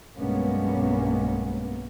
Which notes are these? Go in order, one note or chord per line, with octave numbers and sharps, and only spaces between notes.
B1 G2 G#3 A#3 B3 C#4